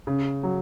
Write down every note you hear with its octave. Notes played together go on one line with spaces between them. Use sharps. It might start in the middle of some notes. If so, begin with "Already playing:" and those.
C#3
F#3